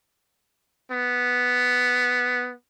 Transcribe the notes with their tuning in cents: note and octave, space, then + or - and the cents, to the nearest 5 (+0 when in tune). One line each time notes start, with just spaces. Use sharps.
B3 +0